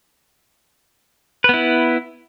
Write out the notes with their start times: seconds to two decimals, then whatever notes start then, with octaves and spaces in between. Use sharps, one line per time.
1.44 B4
1.49 B3
1.54 E4